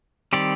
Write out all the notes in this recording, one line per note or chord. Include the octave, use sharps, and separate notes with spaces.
D#3 G3 C4 G4 D5